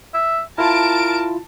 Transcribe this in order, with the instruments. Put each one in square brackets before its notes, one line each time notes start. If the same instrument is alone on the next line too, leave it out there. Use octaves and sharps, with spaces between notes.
[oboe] E5
[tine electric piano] E4 F4 [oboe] A#4 [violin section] A5 D7